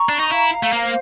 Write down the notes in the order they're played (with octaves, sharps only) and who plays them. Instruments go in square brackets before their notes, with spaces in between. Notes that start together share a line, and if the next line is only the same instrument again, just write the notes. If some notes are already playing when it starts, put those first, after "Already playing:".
Already playing: [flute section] A#5 C#6
[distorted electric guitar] D4
D#4
[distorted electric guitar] E4 [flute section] F5
[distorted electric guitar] A3
[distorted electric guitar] A#3 [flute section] C5